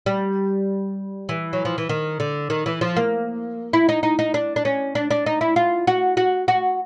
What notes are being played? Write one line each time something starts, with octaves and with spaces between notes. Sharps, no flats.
G3
E3
F#3
F3
E3
D#3
D3
D#3
E3
F3
A#3
E4
D#4
D#4
D#4
D4
D4
C#4
D4
D4
D#4
E4
F4
F#4
F#4
F#4